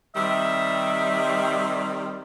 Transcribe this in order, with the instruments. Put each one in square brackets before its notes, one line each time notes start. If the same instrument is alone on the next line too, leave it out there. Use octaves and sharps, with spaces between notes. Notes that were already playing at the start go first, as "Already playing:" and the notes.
[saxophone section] C3 D#3 G3 [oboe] E5